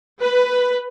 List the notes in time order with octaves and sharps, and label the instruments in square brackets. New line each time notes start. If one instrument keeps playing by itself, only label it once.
[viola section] B4